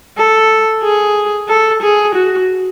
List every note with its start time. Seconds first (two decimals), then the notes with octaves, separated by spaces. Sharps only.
0.18 A4
0.83 G#4
1.49 A4
1.82 G#4
2.15 F#4